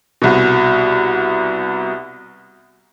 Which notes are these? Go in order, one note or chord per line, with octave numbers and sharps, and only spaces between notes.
C2 B2